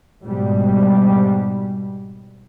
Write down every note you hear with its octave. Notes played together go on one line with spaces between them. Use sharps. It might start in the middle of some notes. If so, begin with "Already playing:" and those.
G#2 B2 G3